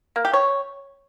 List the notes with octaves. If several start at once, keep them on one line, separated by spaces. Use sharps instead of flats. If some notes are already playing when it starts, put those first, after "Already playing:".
A#3
G4
C#5